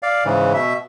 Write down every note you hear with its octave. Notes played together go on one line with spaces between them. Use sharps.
D5 F5
G#2 C#3 E3
B2 E5